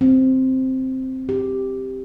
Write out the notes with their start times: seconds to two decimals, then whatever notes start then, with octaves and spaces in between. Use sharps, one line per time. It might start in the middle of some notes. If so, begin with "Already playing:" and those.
0.01 C4
1.29 G4